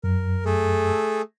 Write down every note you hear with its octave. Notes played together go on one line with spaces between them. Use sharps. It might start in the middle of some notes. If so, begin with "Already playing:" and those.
F#2 A#4
A3 G#4 A4